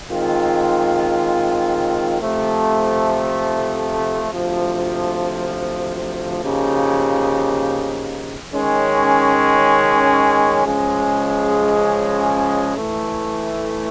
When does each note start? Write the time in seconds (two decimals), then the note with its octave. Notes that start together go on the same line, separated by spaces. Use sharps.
0.11 D#3 G#3 C4 F4
2.21 C3 F3 A3
4.32 D2 C3 F3
6.43 C#3 F3 A#3 D#4 G4
8.54 D#3 G#3 C#4
10.65 C#3 F3 G#3 C#4
12.75 A2 E3 A3